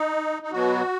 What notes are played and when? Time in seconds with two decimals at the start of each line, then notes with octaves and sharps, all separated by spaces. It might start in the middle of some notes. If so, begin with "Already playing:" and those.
Already playing: D#4
0.42 D#4
0.52 B2 F#3 B3 F#4